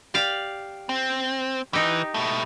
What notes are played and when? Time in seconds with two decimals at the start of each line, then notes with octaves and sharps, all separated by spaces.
0.14 G4 D5 F5
0.89 C4
1.73 E3 D#4 G4
2.14 B2 A3